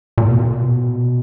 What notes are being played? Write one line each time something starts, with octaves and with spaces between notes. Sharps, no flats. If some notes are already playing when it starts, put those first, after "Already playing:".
A#2
B2
A#2
B2